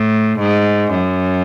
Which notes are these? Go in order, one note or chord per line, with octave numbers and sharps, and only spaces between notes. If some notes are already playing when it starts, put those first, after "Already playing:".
Already playing: A2
G#2
F#2